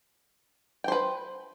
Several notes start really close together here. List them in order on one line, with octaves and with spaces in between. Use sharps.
G5 C5 B4